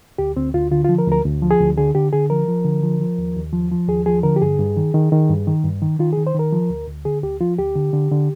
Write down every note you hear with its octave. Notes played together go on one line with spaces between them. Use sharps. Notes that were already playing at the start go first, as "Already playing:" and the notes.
D2 G4
D2 C4
D2 F4
D3 F4
F4
F3
A#4
D2
A#4
D2
F3
G#4
D2
D3 G#4
D3 G4
D3 G#4
F3 A#4
F3
D3
F3
F3
D#2
D#2
F3
F3
D#2 G#4
F3 G#4
D3 A#4
G4
G2 G#4
G2
D#3
D#3
D#3
G2
D#3
G2
D#3
D#3 F4
G#4
D#3
C5
D#3 A#4
F3
D2
D2
D3 G#4
D2 G4
F3 F4
D2 G4
D3
D3
D3